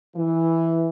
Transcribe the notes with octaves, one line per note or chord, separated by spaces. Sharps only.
E3